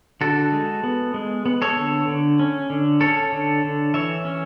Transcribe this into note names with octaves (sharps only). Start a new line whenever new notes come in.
D3 F#4 A4
G#3
B3
G#3
B3
A4 C#5
D3
D3
C#4
D3
C#4 A4 C#5
D3
D3
E3 C#5 E5
C#4